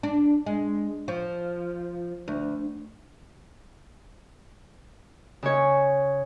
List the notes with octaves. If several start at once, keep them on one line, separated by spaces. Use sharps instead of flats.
D4
G#3
F3
D2
C#3 C#5